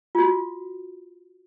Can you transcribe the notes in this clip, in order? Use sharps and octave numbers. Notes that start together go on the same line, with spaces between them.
F4 F#4